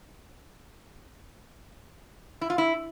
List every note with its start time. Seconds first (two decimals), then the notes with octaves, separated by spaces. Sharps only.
2.41 E4
2.50 F4
2.58 E4